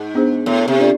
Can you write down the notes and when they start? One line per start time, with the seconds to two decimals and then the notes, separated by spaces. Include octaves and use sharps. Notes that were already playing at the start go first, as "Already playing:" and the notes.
Already playing: G#2
0.14 B3 D4 G#4 C5
0.46 A2 B3
0.68 C3
0.79 D4 F4 A4 D5